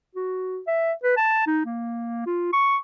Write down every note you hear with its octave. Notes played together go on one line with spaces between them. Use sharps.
F#4
E5
B4
A5
D#4
A#3
F4
C#6